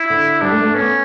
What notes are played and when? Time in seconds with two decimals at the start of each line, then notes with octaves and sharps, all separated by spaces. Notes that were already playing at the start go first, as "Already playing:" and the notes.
Already playing: E4
0.10 D3
0.41 G3 D4
0.52 A3
0.62 A3
0.74 B3 C#4